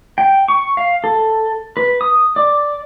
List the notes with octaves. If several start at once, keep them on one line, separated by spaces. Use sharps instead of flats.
G5
C#6
F5
A4
B4
D#6
D5